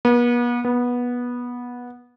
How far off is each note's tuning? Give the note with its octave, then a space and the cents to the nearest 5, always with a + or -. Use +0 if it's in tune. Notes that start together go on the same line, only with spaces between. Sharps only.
B3 -40
B3 -15